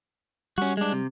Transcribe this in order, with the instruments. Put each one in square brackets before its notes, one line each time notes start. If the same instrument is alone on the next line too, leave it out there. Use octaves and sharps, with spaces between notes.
[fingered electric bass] G3 [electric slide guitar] C#4 F#4
[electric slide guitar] G#3 D4
C3